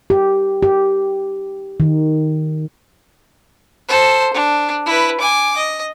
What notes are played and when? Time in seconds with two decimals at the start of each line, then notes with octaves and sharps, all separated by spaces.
0.10 G4
0.63 G4
1.80 D#3
3.88 A4 C5
4.34 D4
4.86 E4 B4
5.21 G#5 D6
5.56 D#5